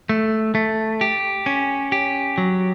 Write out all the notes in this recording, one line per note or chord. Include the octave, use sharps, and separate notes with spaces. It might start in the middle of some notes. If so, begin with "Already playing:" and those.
A3
A3
G4
C#4
G4
F#3